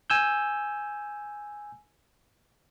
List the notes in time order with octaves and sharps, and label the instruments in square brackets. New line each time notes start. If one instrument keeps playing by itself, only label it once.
[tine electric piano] G#5 E6 G6